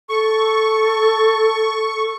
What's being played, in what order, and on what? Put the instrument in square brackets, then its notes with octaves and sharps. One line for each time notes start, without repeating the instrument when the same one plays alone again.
[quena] A4 [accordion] C#6